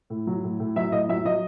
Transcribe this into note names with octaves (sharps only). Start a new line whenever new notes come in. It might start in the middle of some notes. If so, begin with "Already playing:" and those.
A2
F#3
A2
A2
F#3 E5
A2 D#5
F#3 E5
F#3 D#5